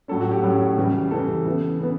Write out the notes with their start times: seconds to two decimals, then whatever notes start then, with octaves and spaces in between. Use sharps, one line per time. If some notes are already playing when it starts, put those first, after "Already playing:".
0.08 A2 F#3 C#4 A4
0.21 F#4
0.31 G4
0.43 A2 F#3 C#4
0.78 C#3 E3 G3
1.11 C#3 E3 G3 A4
1.45 C#3 E3 B3
1.80 C#3 E3 B3